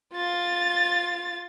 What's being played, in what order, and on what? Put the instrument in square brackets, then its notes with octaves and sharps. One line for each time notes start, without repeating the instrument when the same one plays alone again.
[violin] F4 A6